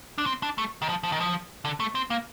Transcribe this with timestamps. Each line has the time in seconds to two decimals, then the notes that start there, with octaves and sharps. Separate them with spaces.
0.18 D4
0.26 C4
0.43 D4
0.58 A3
0.82 D#3
0.89 F3
1.03 F3
1.12 D#3
1.20 F3
1.65 D3
1.80 A3
1.95 C4
2.10 A#3